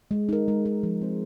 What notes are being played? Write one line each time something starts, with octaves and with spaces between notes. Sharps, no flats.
G#3
D#4 A#4
G#3
D#4 A#4
F3
C4 G#4 C5